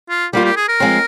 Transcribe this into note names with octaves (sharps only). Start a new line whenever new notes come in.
F4
G3 A#3 F4 G4
G4
G#4
A#4
F3 G#3 C4